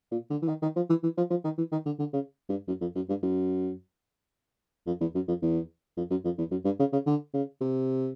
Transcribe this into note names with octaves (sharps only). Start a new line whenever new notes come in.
A#2
D3
E3
D#3
D#3
F3
E3
E3
F3
F3
D#3
E3
D#3
D3
D3
C#3
G2
F#2
F2
F#2
G2
F#2
F2
E2
F#2
F2
E2
F2
F#2
F2
E2
F#2
G2
C#3
C#3
D3
C#3
C3